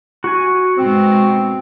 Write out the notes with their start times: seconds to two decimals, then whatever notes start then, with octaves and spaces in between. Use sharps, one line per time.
0.24 F#4 G#5
0.77 G#2 B2 C4